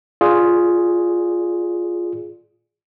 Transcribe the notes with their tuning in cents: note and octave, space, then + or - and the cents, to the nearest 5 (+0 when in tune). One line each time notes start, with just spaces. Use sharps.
F4 +0 G#4 +0 D5 +0